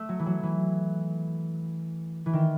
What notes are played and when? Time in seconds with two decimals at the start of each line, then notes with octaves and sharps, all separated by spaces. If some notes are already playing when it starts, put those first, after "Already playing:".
Already playing: A3
0.09 F#3
0.19 E3
0.26 F#3
0.43 E3
2.26 E3
2.33 D#3